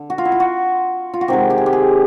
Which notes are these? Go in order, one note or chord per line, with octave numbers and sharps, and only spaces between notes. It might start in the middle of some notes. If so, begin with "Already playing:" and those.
Already playing: D3
F#4
F4
E4
F4
F#4
F4
F#4
C3 D#3 G#3 G4
G4
G#4
G4
G#4